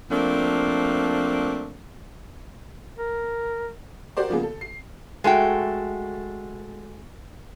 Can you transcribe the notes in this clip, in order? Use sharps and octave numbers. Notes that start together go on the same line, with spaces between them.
F3 A3 A#3 C4 D4
A#4
F#4 G4 A#4 C5 D5
C#3 F3 G#3 A#3 B3 G#4
A4
C7
G#3 A3 F#4 G5